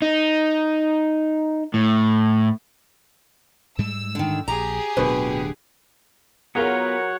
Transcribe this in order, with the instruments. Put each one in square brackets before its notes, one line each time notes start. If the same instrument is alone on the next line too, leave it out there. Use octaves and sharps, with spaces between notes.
[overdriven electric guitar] D#4
A2
[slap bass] G#2 G3 G#3 [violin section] E6
[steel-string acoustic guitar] D3 D#3
[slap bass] A#1 [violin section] G4 G#4 [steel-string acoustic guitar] A#5
[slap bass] D1 F#3 [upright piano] B2 B4 [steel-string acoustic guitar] D3
[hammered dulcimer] F#3 [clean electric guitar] B3 F4 [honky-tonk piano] G#4 A#4 A#5 [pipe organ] C#5 F#5